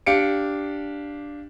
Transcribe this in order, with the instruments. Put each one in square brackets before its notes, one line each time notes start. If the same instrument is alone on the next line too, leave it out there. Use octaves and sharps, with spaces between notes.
[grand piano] D4 G4 F5 C#7 D7